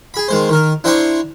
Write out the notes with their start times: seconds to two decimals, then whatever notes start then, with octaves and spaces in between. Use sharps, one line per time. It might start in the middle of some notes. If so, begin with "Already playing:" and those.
0.14 G#4 B5
0.28 D#3 G#3 C5
0.49 D#3 A#4
0.84 D4 E4 C5 G5 A#5 C#6